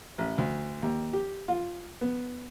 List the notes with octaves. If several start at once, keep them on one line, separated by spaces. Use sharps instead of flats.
A1
D2
D#2
G4
F4
B3